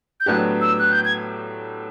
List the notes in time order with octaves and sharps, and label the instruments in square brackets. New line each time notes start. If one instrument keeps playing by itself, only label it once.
[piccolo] G6
[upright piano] A2 F#3 B3 D4 G4 [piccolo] F#6
[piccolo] E6
F#6
G6
G#6